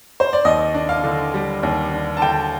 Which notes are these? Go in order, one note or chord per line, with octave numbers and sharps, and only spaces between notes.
C5
D5
D#2 D#5
D4
F5
D3
G3
D#2
D4
A5
D3 G5